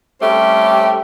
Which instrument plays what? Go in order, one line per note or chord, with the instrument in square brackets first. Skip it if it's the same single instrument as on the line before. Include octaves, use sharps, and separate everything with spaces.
[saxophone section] G3 A3 C4 C#4 G4